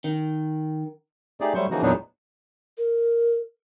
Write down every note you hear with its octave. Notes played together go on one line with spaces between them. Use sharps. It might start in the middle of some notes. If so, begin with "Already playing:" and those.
D#3
A3 D#4 G4 G#4 D5
F#3 G3 A3 C5 C#6 G6
C#3 E3 F3 A#3 D#4 F#4
E2 A#2 F#3 B3 D4 D#4
A#4